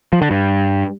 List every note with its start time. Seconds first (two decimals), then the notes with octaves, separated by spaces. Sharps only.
0.13 F3
0.22 D3
0.31 G2